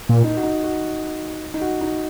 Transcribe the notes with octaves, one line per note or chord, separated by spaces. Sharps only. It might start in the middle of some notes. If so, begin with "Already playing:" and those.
A#2
D#4
F#4
D#4
F#4
D#4
F#4
D#4